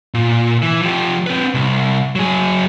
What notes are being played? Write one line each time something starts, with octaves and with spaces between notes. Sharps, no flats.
A#2
E3
F3 G4
C4 B4
C2
F#3 G#4